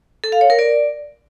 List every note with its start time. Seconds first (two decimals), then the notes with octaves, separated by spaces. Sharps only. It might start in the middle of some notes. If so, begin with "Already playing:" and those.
0.24 A4
0.32 F5
0.41 C#5
0.50 A#4
0.59 D5